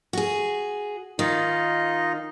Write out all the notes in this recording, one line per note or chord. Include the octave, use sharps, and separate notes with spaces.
F#4 G#4
D#3 D#4 F4 D#5